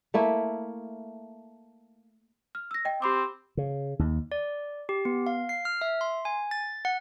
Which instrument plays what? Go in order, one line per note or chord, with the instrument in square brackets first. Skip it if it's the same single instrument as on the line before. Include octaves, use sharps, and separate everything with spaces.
[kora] A3 A#3 E4
[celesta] F6
E6 A#6
D#5 G5
[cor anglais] C4 [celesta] G4 B5 D6
[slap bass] C#3
D#2
[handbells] D5
G4
B3
F5
C7
F6
E5
C6
G#5
A6
F#5